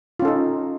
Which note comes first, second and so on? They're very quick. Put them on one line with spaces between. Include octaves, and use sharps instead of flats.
F4 C#4 A4 D#4